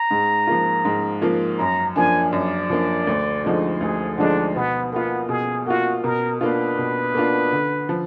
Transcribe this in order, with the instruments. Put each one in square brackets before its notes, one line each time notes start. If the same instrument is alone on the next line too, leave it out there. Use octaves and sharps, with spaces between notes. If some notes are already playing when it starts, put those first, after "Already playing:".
Already playing: [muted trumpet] A#5
[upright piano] G#2
F3 A#3 F4
G#2
F3 A#3 F4
[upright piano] F#2 [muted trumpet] A#5
[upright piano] F3 A#3 D4 [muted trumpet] G#5
[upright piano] F#2 [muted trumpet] D5
[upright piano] F3 A#3 D4
D2
D3 F3 G#3 D#4
[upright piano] D2 [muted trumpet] G#4
[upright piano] D3 F3 G#3 D#4 [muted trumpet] D4
[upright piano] B2 [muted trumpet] B3
[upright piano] A#3 F4 [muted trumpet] B3
[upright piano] B2 [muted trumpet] G#4
[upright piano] A#3 F4 [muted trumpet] F#4
[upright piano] B2 [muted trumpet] A#4
[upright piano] A#3 D4 F4 [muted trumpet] B4
[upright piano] B2
A#3 D4 F4
D3
F3